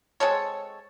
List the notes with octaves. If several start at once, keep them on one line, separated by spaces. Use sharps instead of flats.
G#3 C4 A4 C#5